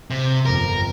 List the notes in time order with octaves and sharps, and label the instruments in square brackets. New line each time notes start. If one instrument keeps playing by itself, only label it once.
[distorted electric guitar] C3
[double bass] G1 F2 [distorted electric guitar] A#4